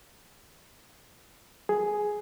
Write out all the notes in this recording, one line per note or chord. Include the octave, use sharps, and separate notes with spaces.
G#4